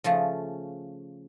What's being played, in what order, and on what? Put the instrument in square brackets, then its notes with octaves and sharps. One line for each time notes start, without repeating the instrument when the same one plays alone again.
[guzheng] C#3 F3 A3